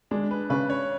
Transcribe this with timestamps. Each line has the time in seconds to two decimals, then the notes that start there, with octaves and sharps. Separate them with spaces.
0.11 G#3 D4
0.31 B4
0.50 C#3 B4
0.70 C#5